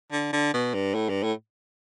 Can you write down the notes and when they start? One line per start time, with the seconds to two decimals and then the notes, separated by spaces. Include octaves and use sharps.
0.12 D3
0.33 D3
0.54 B2
0.74 G2
0.95 A2
1.10 G2
1.24 A2